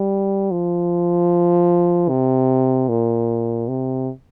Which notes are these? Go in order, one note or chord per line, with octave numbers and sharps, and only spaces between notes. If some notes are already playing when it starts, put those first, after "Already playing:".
Already playing: G3
F3
C3
A#2
C3